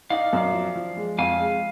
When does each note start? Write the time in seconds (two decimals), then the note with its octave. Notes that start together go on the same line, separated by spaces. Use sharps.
0.10 D#4 D5 F5
0.33 F#2
0.54 F3
0.75 F3
0.97 G#3
1.18 F2 F5 G#5
1.39 G#3